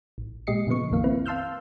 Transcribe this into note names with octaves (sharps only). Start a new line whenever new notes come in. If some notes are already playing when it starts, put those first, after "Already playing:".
A1
A#2 G#3 G4 D#5 C7 C#7
A#2 C#3 F3 B3 C#6
A#1 F2 D#3 A#3 F5
C4 E4 B4
F5 A5 C6 E6 F6 G6